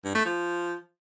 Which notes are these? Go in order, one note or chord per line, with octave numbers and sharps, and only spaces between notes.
G2
A3
F3